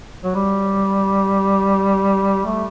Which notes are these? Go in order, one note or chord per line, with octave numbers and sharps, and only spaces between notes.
F#3
G3
A3